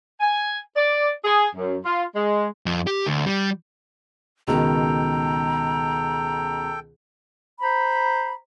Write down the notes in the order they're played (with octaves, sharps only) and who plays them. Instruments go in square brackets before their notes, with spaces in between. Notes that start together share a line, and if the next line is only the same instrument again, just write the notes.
[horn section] G#5
D5
G#4
F#2
F4
G#3
[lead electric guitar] F2
G4
D2
G3
[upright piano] C#2 B2 D#3 [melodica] A4 G5 [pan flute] A#5
[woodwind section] C5 A#5 B5